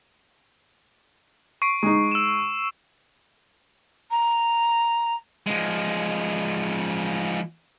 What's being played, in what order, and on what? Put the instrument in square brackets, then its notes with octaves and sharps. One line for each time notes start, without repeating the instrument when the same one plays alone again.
[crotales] C#6 C7 D7
[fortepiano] G#3 D#4
[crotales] E6 E7
[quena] A#5
[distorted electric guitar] F3 G#3